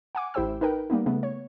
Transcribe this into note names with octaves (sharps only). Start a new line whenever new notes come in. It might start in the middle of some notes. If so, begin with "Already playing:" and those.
F#5 G#5 D6
A1 E4 G4 C5 G5 E6
D#4 A#4 B4 G5
G3 A#3 B3 D#4
C#3 A3 B3
C#5